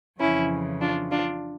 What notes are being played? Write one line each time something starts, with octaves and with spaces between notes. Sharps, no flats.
F2 C#3 E3 C#4 E4
D4 F4
D4 F4